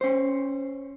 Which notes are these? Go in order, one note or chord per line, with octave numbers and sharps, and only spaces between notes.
C#4 C5